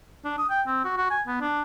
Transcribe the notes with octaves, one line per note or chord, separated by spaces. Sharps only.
D4
D#6
G5
C4
F#4
F#4
G#5
B3
D4